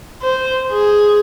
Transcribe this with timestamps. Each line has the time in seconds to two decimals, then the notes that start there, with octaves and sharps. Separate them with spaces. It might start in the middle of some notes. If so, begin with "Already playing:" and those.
0.23 C5
0.72 G#4